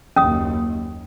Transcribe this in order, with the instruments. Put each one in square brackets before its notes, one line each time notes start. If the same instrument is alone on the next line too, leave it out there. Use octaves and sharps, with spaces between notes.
[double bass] F#1 D#2 [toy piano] C#4 D#6